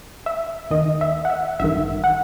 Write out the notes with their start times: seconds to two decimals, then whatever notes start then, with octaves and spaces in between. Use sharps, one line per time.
0.26 E5
0.70 D#2 D#3 D#5
1.01 E5
1.25 F#5
1.30 E5
1.60 A1 G2 D#3 E5
2.04 F#5